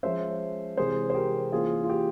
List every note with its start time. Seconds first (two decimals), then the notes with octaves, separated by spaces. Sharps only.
0.03 F3 G#3 C#4 C5 E5
0.77 C3 E3 G#3 C4 G#4 C5
1.10 C5
1.15 G4 A#4
1.52 E3 A#3 C#4 F4 G#4
1.84 F4
1.89 G4